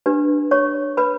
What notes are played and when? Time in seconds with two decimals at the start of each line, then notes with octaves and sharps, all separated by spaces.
0.06 D4 G4 B4
0.51 C#5 C#6
0.97 B4 B5